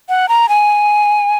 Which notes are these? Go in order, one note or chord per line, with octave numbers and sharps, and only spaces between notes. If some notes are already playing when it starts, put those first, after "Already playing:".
F#5
A#5
G#5